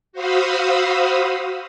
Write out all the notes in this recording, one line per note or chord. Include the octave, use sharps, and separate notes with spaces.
F#4 C5 F5 B5 D#6 E6